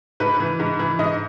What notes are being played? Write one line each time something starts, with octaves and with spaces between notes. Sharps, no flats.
G#2 B4
E3
G#2
E3
G#2 D#5